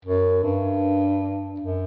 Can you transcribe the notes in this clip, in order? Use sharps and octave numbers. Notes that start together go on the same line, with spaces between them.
F#2
G2
F#2